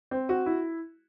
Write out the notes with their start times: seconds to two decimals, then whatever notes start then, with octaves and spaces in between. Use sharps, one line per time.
0.11 C4
0.29 F#4
0.46 E4